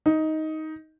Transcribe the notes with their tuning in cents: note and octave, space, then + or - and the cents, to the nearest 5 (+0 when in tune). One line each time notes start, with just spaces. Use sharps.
D#4 +10